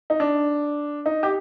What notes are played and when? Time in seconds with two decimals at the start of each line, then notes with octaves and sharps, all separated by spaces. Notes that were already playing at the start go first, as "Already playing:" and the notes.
0.10 D#4
0.20 D4
1.06 D#4
1.23 G4